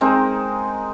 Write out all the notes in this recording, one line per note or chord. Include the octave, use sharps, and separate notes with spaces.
G#3 C4 D#4 A#4